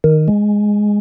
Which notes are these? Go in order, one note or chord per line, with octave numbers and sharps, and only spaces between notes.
D#3
G#3